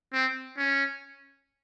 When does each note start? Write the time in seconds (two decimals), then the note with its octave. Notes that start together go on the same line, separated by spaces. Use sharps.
0.13 C4
0.57 C#4